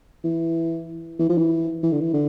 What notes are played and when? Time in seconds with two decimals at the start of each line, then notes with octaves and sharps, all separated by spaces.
0.24 E3
1.19 E3
1.29 F3
1.38 E3
1.83 E3
1.92 D3
2.01 E3
2.14 D3